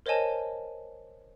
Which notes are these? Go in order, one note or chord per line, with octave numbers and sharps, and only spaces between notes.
A#4 C5 C#5 D#5 G#5 A5